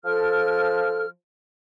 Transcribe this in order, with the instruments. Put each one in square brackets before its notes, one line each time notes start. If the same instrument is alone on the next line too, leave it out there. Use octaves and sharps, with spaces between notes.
[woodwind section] F3 F6 [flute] A4